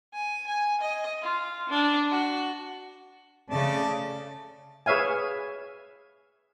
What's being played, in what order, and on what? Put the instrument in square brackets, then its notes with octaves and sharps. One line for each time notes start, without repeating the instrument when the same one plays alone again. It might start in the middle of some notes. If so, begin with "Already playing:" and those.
[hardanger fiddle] G#5
G#5
D#5
F4
D4
F#4
[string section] C#3 [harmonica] A3 D5 A5
[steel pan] G#4 B4 C#5 E5 F5 G#5